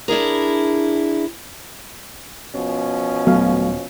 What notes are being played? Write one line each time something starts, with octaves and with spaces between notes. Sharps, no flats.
D4 E4 G#4 A#4
B2 F3 C#4
D#1 F#3 A3 B3 F5